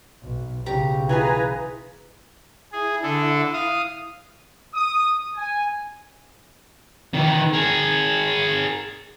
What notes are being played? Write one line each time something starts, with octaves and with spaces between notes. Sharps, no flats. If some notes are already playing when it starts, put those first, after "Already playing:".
B1
B1 C#3 G4 A#5 D6
E3 F4 G#4 B4 G#5 A#5
E4 G#4
D3 D4 A4
F5 D#6
D#6
G#5
D#3 E3
G#4 A#4